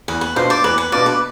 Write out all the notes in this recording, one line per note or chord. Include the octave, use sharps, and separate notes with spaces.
E2 B4
B4
B2 B3 D4 F4 C5
D5
E2 B4
B4
B2 B3 D4 F4 D5
B4